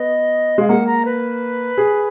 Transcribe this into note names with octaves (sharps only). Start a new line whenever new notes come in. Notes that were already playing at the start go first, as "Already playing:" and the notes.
Already playing: B3 D#5
G#3 F5
A#3 F#5
A#5
B4
G#4